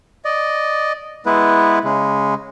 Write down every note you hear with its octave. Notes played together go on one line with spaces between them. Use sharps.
D5 D#5
G#3 B3 E4 B4
C#3 G#3